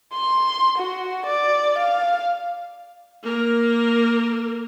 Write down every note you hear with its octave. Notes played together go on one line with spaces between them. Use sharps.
C6
F#4
D5
F5
A#3 A#4